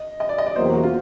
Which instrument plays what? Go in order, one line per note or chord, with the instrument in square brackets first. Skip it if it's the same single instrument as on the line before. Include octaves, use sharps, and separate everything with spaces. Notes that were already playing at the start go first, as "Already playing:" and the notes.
Already playing: [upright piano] D#5
D#5
D5
D#5
D5
[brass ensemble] E2 B2 F#3 A#3 [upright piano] C5
[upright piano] G4
F#4
F4